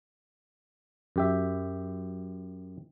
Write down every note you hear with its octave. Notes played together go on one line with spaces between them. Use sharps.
F#2 G4 E5